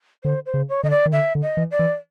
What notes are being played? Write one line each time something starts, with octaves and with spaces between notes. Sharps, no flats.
D3 C5
C5
C#3
C#5
D3 D#5
D5
D#3
D3 E5
D3
D#5
E3
D5
E3